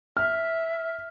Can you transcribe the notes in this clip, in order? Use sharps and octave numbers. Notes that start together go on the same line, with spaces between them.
E5 F6